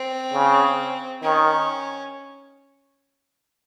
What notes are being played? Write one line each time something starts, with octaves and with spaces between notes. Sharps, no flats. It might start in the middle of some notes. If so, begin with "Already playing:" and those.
Already playing: C4
C#3
D#3 C#4